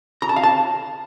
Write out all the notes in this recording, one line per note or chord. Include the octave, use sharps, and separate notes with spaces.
A#5
A5
F5
A5